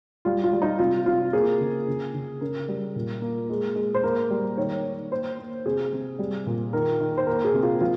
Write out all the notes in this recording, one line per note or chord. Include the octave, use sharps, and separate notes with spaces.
G3 F4
F4
G3
D#4
C3 F4
C3 F4
A#3 G#4
C#3
C#3
C#3
C#3 A#4
G3
A#2
A#3
G#3
G#3
C5
A#3 A#4
G3
D#3 C#5
D#3
A#3 C5
A#3
C3 G#4
C3
G3
A#2
D#3 A#4
D#3
C5
A#3 A#4
G#4
C3
F4
F3 F4